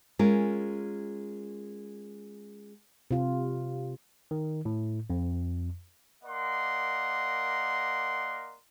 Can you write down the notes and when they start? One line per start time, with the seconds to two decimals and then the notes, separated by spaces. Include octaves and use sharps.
0.19 G#3 C#4 F4 A#4
3.11 C3 F4
4.31 D#3
4.65 A2
5.10 F2
6.24 A#3 A#4 D5 D#5 F#5 C6